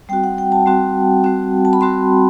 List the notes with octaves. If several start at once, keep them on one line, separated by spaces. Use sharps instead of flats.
G3 C4 F#4 G5
F#5
G5
A5
G3 C4 F#4
G3 C4 F#4
A5
B5
G3 C4 F#4 C6